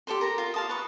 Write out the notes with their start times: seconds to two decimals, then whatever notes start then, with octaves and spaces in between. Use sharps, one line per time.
0.07 G4 A4 C5 C6
0.21 A#4 A#5
0.38 F4
0.54 F5 A5 D#6
0.69 B4 C#6